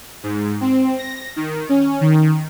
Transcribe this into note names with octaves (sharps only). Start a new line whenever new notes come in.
G#2
C4
A#6
D#3
C#4
D#3